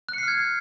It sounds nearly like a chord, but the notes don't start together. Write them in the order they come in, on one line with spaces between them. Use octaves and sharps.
F#6 C#7 C7 F6 G#6